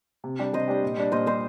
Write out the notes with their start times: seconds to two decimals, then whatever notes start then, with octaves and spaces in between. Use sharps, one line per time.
0.24 C3
0.39 G3 D4 G4
0.53 C3 C5 D#5
0.68 G3 D4 G4
0.82 A#2
0.97 G3 D4
1.12 A#2 C5 D#5
1.26 G3 D4 C5 D#5